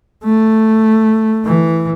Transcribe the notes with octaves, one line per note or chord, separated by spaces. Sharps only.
A3
E3